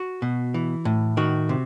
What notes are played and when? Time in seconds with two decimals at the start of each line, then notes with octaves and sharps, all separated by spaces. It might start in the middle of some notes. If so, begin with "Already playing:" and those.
Already playing: F#4
0.22 B2
0.54 E3
0.85 A2
1.17 D#3 F#4
1.49 C3